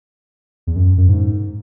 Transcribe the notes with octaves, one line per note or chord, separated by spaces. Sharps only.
E2
F#2
F#2
G#2